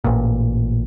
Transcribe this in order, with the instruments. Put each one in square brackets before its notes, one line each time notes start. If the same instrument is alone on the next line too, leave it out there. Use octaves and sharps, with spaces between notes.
[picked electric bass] A1 A#2